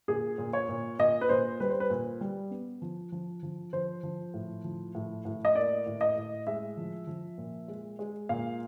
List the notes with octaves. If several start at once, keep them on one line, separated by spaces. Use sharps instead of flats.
A#2 G#4
A#2
C#5
A#2
A#2 D#5
B4
A#2 C5
G3 B4
C5
B4
A#2
G3
B3
F3
F3
F3
F3 C5
F3
A2
F3
A2
A2
D#5
A#3 D5
A2
D#5
A2
G#3 E5
F3
F3
A#2
G#3
G#3
A#2 F5